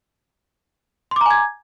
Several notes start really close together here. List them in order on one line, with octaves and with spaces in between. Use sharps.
C6 D6 A#5 G#5 G#6